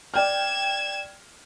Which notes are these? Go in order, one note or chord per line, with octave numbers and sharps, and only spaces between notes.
D5 G5 F6 G#6 E7